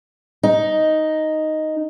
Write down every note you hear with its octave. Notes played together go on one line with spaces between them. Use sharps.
D#4